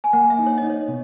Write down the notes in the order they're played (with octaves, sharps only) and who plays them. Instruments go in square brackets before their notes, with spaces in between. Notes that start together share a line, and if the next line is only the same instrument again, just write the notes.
[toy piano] G#5
[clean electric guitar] A#3 [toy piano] F#5
[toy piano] E5
[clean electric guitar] D#4
[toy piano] C#5
D#5
[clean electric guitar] D#4
[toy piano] C#5
[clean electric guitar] B2